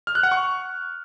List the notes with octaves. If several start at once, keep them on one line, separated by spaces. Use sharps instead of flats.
F6
F#6
F#5
C#6